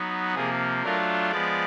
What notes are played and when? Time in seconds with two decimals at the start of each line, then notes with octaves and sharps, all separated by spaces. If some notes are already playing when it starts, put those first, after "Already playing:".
Already playing: F#3 B3 D#4
0.34 C3 F3 A#3 G#4
0.83 F#3 A3 D4 F4 A#4
1.31 F3 G#3 B3 D5